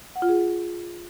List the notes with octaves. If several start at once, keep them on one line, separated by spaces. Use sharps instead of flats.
F#5
F4
G#4